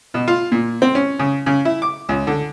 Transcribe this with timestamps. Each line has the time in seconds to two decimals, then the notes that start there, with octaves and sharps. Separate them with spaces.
0.14 B2
0.28 F4
0.52 A#2
0.82 C4
0.95 C#4
1.19 C#3
1.46 C#3
1.65 E4
1.82 D6
2.09 C#2
2.27 D3